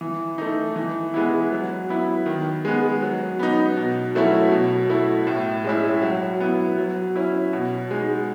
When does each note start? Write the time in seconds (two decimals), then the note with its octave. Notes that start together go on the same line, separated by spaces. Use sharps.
0.01 E3
0.38 A3 D#4
0.76 E3
1.14 G#3 B3 E4
1.52 F#3
1.89 B3 E4
2.26 D#3
2.65 G#3 B3
3.02 F#3
3.39 B3 D#4
3.77 B2
4.15 F#3 A3 C#4 E4
4.51 B2
4.90 A3 E4
5.27 A2
5.64 G#3 C#4 E4
6.02 F#3
6.40 B3 E4
6.78 F#3
7.15 C#4 E4
7.53 B2
7.91 G#3 D#4